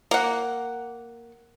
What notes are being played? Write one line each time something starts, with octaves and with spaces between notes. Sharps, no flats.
A#3 F#5